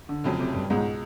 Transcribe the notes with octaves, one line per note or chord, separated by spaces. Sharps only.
D3
F1 F2 C#3 F#3
C3
G2
C#2 G#2 B2 G#3